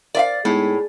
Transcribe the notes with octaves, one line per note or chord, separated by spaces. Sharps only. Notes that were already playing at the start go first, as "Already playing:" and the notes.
A#4 C5 D5 E5 F5
A2 G#3 B3 D#4 G#4